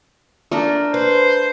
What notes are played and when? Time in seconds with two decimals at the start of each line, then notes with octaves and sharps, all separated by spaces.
0.51 A3 D4 A#4
0.94 B4 C5